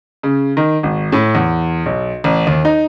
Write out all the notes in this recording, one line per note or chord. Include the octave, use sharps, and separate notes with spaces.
C#3
D#3
G#1
A2
E2
B1
A1
D#2
D#4